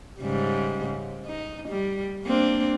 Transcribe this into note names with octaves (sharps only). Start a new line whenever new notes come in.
G#2 C#3 G3
D#4
G3
A#3 C4 D4